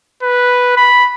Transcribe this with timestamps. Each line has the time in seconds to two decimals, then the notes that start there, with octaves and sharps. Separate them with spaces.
0.23 B4
0.77 B5